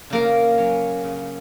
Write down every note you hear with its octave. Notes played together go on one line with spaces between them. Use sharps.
C#3 A#3 A#4
F#3 C#4
C#3